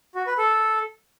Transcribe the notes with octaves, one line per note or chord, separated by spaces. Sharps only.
F#4
B4
A4